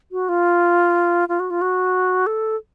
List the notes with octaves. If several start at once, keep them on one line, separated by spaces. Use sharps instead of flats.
F#4
F4
F4
F#4
F4
F#4
A4